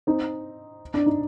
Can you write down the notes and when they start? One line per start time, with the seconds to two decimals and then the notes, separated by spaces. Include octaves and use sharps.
0.07 C4 D#4
0.94 D4
1.06 D#4